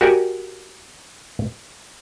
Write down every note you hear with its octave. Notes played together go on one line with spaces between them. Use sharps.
F#4 G4 A#4 D5 F#5 G#5